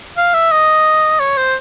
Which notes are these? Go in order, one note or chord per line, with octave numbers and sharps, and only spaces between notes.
F5
E5
D#5
C#5
C5